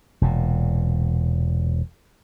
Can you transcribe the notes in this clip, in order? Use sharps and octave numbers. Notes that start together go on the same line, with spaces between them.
E1 A#2